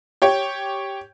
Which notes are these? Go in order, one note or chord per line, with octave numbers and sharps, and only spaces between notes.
G4 C#5 G5